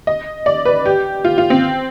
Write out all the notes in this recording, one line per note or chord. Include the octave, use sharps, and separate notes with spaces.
D#5
D5
B4
G4
F4
F4
C4